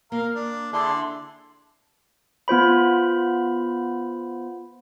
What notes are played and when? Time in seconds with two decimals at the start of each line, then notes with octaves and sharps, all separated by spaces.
0.12 A#3 A#4 F5
0.35 D4
0.73 D3 D4 E4 G#4 D5 C6
2.48 B3 F4 C5 B5